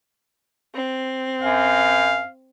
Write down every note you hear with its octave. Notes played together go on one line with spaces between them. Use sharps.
C4
F#2 F5